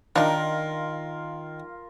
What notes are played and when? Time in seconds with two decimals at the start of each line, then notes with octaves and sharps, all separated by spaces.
0.16 D#3 D4 D#4 F4 A#4 F5